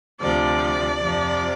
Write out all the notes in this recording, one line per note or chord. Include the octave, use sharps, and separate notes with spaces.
D2 C3 F3 D5
F2 C3 F3